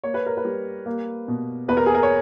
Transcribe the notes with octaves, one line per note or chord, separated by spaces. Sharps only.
A#3 C#5
B4
A#4
B4
G3
A#3
B2
E2 B4
A#4
G#4
A#4
C#5